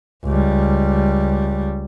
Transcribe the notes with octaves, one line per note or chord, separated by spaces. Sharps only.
C#2 G3